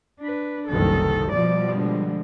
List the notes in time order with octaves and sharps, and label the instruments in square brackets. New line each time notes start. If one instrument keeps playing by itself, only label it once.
[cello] D4 B4
[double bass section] F#1 C2 D#3 [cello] A4
[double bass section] B2 F3 G3 [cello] D5
[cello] D3 G#3